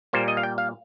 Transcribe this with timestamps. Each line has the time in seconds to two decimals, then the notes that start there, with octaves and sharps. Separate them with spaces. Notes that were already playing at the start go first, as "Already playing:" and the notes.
0.13 A#2 G3 A#3 C5
0.28 D#5
0.37 F5
0.43 G5
0.58 F5